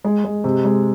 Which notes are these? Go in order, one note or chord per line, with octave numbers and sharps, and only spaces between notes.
G#3
G#3
C3
G#3